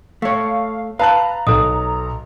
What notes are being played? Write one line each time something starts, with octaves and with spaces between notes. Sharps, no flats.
A3 C#5 F5
B4 F5 A5 A#5 F#6
B1 A4 D#6